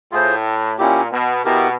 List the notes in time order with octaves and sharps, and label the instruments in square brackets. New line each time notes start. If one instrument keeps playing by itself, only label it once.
[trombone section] A2 [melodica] F4 G#4 C5
[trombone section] A#2 [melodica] C#4 E4 G4
[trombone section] B2
[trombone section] B2 [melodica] B3 E4 G4 A#4